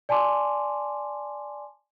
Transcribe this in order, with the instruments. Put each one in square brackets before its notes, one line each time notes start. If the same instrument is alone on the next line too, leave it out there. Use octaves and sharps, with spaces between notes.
[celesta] D5 G#5 A5 C6 D6